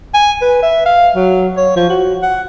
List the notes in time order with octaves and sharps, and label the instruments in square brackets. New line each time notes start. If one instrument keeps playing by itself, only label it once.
[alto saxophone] G#5
B4
E5
F5
F#3
C#5
F3
F#4
F#5